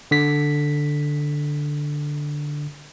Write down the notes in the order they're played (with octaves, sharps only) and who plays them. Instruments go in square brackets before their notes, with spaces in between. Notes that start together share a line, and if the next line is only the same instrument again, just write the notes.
[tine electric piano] D3 B6